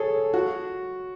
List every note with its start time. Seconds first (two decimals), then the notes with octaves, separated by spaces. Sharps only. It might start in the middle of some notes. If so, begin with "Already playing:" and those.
Already playing: G#4 A4 C#5
0.34 F#4